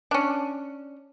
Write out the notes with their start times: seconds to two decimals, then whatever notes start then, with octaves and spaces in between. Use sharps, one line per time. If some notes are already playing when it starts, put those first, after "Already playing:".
0.11 C#4 D4